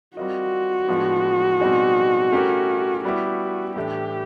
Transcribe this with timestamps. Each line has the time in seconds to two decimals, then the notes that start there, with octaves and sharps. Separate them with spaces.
0.16 G3 C4 F4 F#4 A#4 D#5
0.88 A2 F3 G#3 B3 D4
1.60 B2 G3 C4 D#4 G#4
2.32 A3 C#4 E4 G4 A#4
3.04 G3 B3 E4 F#4 G4
3.76 A2 E3 A3 D4 G4